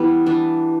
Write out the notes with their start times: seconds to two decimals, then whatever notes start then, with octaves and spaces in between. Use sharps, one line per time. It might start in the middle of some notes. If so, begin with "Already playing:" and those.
Already playing: E3 G3 B3 E4
0.26 E3 D4